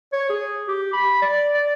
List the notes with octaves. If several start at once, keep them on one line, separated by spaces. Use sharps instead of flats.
C#5
G#4
G4
B5
D5
D5